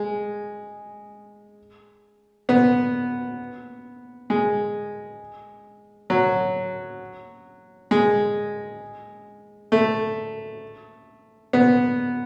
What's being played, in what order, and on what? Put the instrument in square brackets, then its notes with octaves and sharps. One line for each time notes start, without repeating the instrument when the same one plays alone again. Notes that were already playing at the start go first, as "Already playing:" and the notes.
Already playing: [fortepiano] G#3
B3
G#3
F#3
G#3
A3
B3